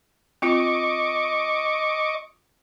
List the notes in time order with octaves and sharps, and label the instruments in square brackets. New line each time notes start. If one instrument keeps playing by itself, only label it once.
[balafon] C4 F4 [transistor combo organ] D#5 C#6 D6